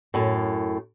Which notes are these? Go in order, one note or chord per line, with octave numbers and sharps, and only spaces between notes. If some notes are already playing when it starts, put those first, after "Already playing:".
F#2 A2